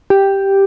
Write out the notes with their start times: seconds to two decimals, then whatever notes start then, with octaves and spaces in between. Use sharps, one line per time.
0.10 G4